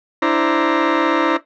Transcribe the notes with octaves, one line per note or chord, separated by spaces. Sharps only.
D4 E4 C5 A#5